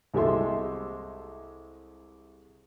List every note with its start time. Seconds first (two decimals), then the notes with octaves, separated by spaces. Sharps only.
0.14 C2 G#3 G4 A4 E5 C6